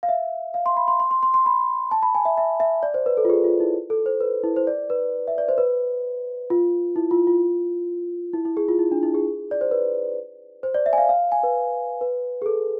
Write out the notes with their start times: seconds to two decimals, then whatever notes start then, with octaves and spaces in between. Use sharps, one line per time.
0.03 F5
0.09 E5
0.54 F5
0.66 C6
0.77 B5
0.88 C6
1.00 C6
1.11 C6
1.23 C6
1.34 C6
1.46 B5
1.91 A5
2.03 B5
2.15 G#5
2.25 E5
2.37 E5
2.60 E5
2.83 D5
2.94 C5
3.06 B4
3.17 A4
3.25 F4
3.30 G#4
3.44 F4
3.60 E4
3.90 A4
4.06 C5
4.20 B4
4.44 E4
4.56 C5
4.67 D5
4.90 B4
5.28 E5
5.38 D5
5.49 C5
5.58 B4
6.50 F4
6.96 E4
7.11 F4
7.27 F4
8.33 E4
8.45 E4
8.57 G#4
8.69 F4
8.79 E4
8.91 D4
9.03 E4
9.14 G#4
9.51 D5
9.61 C5
9.71 B4
10.63 C5
10.74 D5
10.86 E5
10.93 G#5
10.98 F5
11.09 F5
11.32 G#5
11.43 B4
12.01 B4
12.42 G#4
12.46 A4